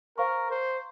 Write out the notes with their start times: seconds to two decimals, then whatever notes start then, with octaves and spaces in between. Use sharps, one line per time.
0.18 A#4 C5 F5 A#5 C#6
0.50 C5